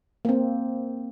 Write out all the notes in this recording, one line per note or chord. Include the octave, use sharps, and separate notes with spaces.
A#3 C4